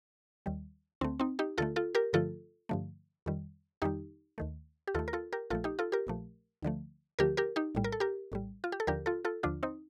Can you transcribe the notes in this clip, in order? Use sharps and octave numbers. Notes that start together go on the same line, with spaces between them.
D#2 D#3 G3
D2 D3 A3 C4
C4 D#4
D#4 G4
D2 D3 A3 F4 A4
F4 A4
G4 A#4
G2 D3 F3 A3 F4 A4
G2 D3 F3 A3
F2 D#3 G3
F2 D#3 G3 D#4 G4
D#2 D#3 A3
G4
D#2 D#3 A3 F4 A4
A#4
F4 A4
G4 A#4
A#1 A#2 F3 A3 F4 A4
D#4 G4
F4 A4
G4 A#4
A#1 A#2 F3 A3
D2 D3 F3 A3
D2 D3 F3 A3 G4 A#4
G4 A#4
D#4 G4
A#1 A2 G3
A#4
A4
G4 A#4
A#1 A2 G3
F4
G4
A4
D#2 D3 F3 G4 A#4
F4 A4
F4 A4
D#2 D3 F3 D4 F4
C4 D#4